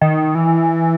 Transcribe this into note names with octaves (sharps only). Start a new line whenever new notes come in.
D#3
E3